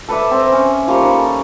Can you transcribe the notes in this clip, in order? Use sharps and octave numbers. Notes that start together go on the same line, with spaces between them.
A4 B4 D5 E5
C4 A#5
C#4
F3 G3 A#3 C#5
D#4
A4